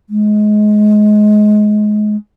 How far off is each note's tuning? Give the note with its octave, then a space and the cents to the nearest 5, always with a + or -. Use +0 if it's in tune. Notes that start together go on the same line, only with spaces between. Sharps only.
G#3 +25